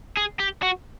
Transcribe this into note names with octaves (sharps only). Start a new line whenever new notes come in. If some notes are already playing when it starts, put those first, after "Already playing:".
G#4
G4
F#4